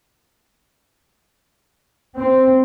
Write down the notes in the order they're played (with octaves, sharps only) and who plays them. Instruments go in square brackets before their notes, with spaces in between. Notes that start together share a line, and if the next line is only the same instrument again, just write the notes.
[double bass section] C4